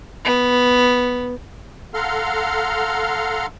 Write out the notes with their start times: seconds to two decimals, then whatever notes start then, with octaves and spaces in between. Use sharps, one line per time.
0.25 B3
1.94 A4 F5 F#5 A#5 C6 F6